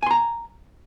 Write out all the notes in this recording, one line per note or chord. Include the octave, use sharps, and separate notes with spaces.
G#5 A#5 C6